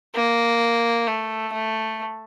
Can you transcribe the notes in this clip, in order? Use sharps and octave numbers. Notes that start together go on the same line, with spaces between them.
A#3
A3
A3